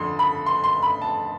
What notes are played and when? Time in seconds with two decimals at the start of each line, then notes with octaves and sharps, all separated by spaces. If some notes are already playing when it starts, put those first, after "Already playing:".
Already playing: F2 D3 C6
0.19 B5
0.46 C6
0.64 C6
0.82 B5
1.01 A5